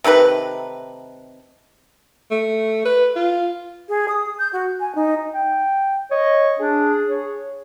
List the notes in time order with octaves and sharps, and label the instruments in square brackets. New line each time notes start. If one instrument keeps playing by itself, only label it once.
[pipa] C3 D#3 A3 B4
[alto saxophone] A3
B4
F4
[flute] G#4
D#6
G6
F#4
G#5
D#4
[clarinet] G5
[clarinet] C#5 [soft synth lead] D#5
[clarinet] D4 [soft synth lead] G#4
[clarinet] C#5